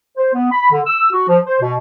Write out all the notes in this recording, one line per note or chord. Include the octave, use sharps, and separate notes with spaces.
C5
B3
B5
D3
E6
F#4
F3
C5
B2